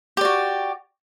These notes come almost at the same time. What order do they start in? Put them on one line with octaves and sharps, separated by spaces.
G4 D5 F#4